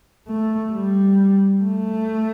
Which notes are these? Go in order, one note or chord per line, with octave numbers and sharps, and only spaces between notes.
A3
G3
A3